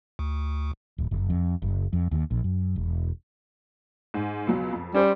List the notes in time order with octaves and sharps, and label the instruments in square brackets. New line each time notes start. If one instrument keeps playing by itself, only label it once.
[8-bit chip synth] D2
[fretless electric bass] D1
F#1
F2
F#1
F2
D#2
A#1
F#2
E1
[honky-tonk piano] G#2
C#2 B2 F#3
F2
[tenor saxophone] G3 [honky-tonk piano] C#4 C5